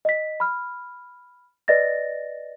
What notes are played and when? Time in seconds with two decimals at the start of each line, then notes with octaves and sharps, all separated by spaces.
0.05 D#5 B6
0.40 B5 F6
1.68 B4 D5 D#5 A6 A#6